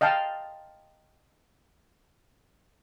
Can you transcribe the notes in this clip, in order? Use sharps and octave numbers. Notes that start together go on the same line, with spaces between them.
D#5 F5 G5 A5